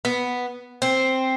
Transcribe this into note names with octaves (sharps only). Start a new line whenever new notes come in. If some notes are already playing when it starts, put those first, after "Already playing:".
B3
C4